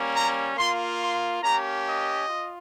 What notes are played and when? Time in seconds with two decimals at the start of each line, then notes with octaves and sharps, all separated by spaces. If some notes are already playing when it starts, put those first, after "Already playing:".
Already playing: G3 A#3 C#4
0.15 A#5
0.57 A#3 F4 C6
1.01 C6
1.42 A#3 C#4 G4 A#5
1.85 D#5
2.27 F4